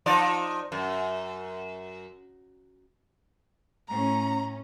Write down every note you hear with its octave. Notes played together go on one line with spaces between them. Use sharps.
F3 D#4 D5
F#2
A2 C#4 A#5